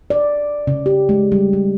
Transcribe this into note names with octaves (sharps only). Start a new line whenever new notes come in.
D5
C#3
G4
G#3
G3
G3